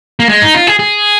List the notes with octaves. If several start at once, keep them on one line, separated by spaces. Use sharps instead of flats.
A#3
G#3
D#4
F4
G#4
G#4